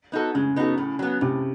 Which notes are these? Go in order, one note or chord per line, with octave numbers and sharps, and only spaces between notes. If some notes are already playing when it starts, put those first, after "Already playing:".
B3 D#4 F#4 A4
C#3 G#3
B3 D#4 F#4 A4
A2
F#3 B3
A2 C3